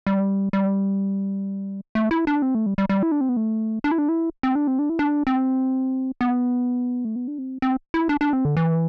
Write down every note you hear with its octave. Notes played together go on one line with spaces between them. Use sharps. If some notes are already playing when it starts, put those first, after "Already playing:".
G3
G3
A3
E4
D4
C4
A3
G3
G3
G3
E4
D4
C4
B3
A3
D4
E4
D4
E4
C4
D4
C4
D4
E4
D4
C4
B3
A3
B3
D4
C4
C4
E4
D4
D4
C4
D3
E3